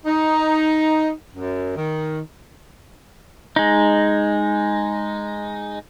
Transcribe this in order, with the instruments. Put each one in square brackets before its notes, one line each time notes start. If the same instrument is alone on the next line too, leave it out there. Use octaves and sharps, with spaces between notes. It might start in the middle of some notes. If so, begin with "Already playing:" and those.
[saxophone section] D#4
F#2
D#3
[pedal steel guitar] G#3 D#4